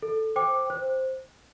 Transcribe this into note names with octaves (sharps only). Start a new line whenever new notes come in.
A4
C5 G5 D6
C5